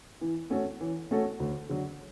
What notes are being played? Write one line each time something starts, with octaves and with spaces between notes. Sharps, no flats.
E3
A3 C#4 F#4 A4
E3
A3 C#4 F#4 A4
D2
D3 F#3